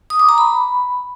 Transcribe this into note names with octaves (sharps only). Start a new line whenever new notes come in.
D#6
D6
A#5
B5